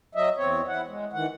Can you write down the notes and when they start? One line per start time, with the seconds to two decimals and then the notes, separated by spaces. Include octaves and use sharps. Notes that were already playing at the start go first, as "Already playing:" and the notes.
0.15 F#3 D#5 E5
0.37 E2 C4 C#5
0.68 E4 F#5
0.88 G#3
1.13 D#3 E3 F#5